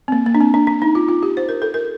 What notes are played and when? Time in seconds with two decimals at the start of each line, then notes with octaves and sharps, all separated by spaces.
0.08 C4
0.12 A#3
0.26 A#3
0.35 D4
0.40 C4
0.54 D4
0.67 D4
0.82 D#4
0.95 F4
1.09 F4
1.23 G4
1.37 C5
1.49 A#4
1.62 A4
1.74 A#4